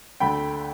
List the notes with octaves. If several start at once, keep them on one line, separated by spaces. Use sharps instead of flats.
D2 D3 A3 G5 B5